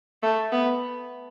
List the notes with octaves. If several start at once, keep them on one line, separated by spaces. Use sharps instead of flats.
A3
B3